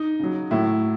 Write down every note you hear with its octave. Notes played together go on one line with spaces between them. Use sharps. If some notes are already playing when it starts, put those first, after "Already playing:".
Already playing: D#4
C#3 F#3
A2 F#3 E4